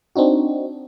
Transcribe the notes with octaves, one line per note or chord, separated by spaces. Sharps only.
C4 D4 D#4 F#4